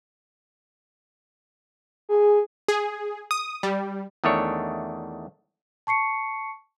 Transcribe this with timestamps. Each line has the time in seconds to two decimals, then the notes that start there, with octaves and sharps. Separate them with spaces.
2.09 G#4
2.68 G#4
3.31 D#6
3.63 G3
4.24 E2 D#3 A3 D4 C#5
5.87 A5 C#6 C7 C#7